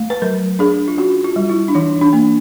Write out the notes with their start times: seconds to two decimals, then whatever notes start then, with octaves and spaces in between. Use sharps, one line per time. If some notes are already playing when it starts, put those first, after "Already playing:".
Already playing: A3
0.10 B4
0.22 F#3 A#4
0.59 D4 G#4
0.88 F4
0.98 C#4 F#4
1.24 F4
1.36 G3
1.49 E4
1.68 D4
1.75 E3 D#4
2.01 D4
2.13 A#3